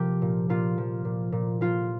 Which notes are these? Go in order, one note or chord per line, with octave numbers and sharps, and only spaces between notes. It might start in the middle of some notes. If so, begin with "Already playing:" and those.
Already playing: C3 F3 G4 A#4
A#2
A#2 F4
F3
A#2
A#2
F3 F4